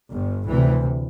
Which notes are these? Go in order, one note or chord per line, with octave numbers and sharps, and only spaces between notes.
G1 G2
D2 C3 E3